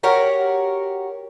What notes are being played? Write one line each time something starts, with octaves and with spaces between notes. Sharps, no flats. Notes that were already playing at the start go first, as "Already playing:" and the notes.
F#4 G4 A#4 C#5